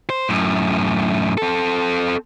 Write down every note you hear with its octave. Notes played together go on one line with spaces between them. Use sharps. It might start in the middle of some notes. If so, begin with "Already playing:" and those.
C5
F#2 A2
C4 A4